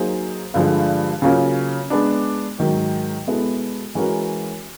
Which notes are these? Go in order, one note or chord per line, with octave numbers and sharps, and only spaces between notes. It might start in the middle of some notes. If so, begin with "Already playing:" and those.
Already playing: F#3 A#3 D#4 G#4 C5
G2 D3 F3 G#3
C#3 F#3 A#3 C#4 F4
G#3 B3 D4
G#2 D#3 F#3
B2 G#3 B3 E4 A4
E3 G#3 C#4 F#4 A#4